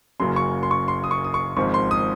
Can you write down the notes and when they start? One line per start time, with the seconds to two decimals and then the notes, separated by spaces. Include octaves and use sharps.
0.20 F#1 F#2 C#3 F#3 C#4 C6
0.36 C#6
0.63 C6
0.71 C#6
0.88 C6
1.04 D#6
1.11 C#6
1.25 D#6
1.34 C#6
1.57 G#1 G#2 F3 C4 C#6
1.74 C6
1.91 D#6